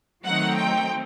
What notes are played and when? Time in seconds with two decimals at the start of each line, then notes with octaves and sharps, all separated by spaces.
0.25 D#3 F#3 A3 C4 D#4 F#5
0.56 G5